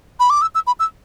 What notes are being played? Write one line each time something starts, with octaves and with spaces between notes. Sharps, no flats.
B5
D6
E6
E6
B5
E6